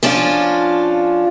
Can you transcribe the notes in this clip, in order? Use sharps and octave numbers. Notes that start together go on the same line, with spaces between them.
F3 C#4 D4 F4